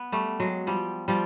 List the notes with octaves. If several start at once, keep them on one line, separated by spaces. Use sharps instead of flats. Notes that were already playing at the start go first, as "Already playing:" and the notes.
Already playing: B3
G3 A3
F#3 G#3
F3 G3
F3 G3